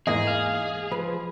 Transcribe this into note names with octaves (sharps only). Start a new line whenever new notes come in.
E2 G#2 A#3 G#4 D#5
F5
F3 B4